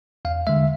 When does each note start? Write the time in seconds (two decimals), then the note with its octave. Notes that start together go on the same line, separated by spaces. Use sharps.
0.25 E2 F5
0.47 D3 G#3 E5